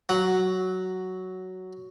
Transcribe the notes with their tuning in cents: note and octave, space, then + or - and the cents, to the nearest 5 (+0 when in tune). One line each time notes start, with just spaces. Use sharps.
F#3 +5 F#5 +0